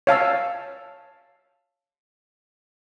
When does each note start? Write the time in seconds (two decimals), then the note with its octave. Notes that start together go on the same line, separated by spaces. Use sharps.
0.07 C#5 F5 A5 E6